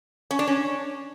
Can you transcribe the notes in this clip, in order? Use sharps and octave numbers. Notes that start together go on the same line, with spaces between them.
C#4
D4
C#4